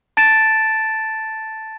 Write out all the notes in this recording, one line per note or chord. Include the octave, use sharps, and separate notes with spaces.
A5 A6 D7 E7